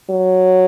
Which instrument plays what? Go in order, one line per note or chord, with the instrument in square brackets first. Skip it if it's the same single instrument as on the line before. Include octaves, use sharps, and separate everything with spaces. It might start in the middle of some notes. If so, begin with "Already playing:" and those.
[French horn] F#3